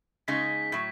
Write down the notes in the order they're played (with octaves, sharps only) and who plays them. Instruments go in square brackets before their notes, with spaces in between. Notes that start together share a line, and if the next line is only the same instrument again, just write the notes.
[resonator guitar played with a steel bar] C#3 G#3 D#4 G#4 [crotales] B6
[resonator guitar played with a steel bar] A2 F#3